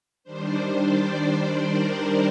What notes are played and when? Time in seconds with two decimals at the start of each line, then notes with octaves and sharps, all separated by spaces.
0.24 D#3 G3 D4 C5
0.73 D5
1.22 C5
1.71 A#4